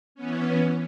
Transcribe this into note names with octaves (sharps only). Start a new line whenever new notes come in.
E3 B3 C#4